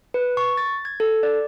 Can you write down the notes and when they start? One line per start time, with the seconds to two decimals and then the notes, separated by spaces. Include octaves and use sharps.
0.14 B4
0.37 C#6
0.57 A6
0.85 G#6
1.00 A4
1.23 D5